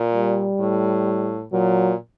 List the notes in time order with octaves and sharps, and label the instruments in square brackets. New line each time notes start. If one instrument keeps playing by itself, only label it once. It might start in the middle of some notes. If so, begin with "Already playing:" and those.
Already playing: [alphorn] A#2
[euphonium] G3
[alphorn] A2
[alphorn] A#2 [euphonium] F#3